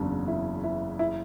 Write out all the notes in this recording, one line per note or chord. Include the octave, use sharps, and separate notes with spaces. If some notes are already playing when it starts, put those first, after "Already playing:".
Already playing: F#1 E2 C#3 F#3 D4
E4
E4
E4